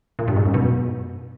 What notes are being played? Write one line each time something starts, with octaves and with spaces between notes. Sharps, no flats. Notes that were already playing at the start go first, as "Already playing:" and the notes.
A#2
G2
G#2
F#2
B2